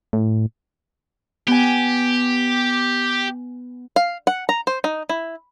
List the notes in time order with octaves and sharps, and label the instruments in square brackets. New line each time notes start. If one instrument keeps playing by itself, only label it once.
[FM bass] A2
[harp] B3 G#5 [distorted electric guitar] G4
[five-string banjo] F5
F#5
A#5
C5
D#4
E4